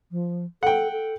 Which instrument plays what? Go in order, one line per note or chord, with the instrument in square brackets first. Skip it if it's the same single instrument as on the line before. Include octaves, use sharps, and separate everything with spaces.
[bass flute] F3
[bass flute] A4 [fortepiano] F#5 G5
[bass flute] A4